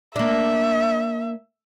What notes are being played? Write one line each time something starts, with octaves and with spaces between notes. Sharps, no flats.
A#3 D4 E5